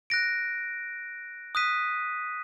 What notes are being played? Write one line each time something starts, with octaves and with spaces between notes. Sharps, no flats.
F#6 A#6 D7
D#6 F#6 B6 D#7